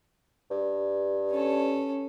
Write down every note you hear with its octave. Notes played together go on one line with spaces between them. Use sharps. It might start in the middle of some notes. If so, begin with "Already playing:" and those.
G2
C#4 A4